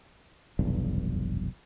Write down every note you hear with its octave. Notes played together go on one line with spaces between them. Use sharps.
F1 B1 E2 G2